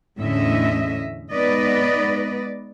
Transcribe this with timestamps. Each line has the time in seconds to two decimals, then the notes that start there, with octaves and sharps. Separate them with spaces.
0.20 E2 A2 D3 C#4 D#5 E5
1.33 G#3 B3 D#4 B4 D5 D#5